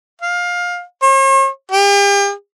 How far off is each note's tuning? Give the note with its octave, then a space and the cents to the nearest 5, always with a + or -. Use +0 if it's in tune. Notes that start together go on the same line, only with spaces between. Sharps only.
F5 +20
C#5 -45
G4 +40